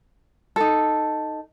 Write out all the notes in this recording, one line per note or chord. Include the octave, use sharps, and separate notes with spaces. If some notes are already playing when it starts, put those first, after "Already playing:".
D#4 A4